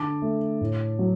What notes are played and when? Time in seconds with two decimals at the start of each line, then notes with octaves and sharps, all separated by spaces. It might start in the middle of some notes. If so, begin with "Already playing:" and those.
Already playing: D3 A5 D6
0.22 A3
0.61 A2
0.99 F#3